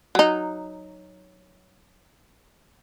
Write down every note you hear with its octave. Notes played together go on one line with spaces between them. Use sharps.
F#3 D#4